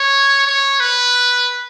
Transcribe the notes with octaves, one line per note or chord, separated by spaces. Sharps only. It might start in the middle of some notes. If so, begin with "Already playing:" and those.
Already playing: C#5
C#5
B4